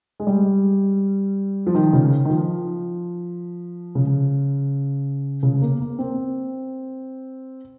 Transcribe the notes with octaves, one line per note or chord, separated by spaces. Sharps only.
G#3
G3
F3
D#3
C#3
D#3
F3
C#3
C#3
A#3
A#3
C4